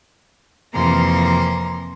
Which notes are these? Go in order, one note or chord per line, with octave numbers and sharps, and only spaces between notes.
F2 C3 E3 A#3 A#5 C6